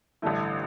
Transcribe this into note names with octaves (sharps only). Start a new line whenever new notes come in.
A1 G2 D3 A3 E4